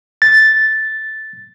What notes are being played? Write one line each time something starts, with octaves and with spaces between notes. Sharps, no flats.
A6